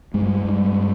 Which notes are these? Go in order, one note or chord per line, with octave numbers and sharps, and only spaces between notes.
G2 G#3
G2